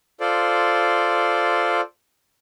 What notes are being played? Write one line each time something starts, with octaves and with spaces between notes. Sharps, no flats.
F4 A4 C5 D5